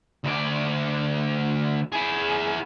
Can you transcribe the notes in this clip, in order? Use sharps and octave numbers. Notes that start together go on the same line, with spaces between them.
D2 D5
E4 G#4